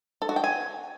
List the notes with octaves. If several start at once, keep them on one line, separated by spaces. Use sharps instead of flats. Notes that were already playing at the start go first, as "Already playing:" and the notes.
A4
F#4
G5
G#5